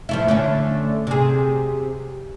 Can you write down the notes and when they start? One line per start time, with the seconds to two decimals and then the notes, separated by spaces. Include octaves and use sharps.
0.09 F3 A3 E4
0.28 D3 A3 C#4
1.07 C3 G#4